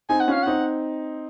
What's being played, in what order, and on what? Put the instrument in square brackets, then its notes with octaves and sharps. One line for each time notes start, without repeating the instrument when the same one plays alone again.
[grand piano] C4 D#4 [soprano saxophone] G#5
[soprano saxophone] F#5
[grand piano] C#4 F4 [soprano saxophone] F5
[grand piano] C4 D#4 [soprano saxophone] F#5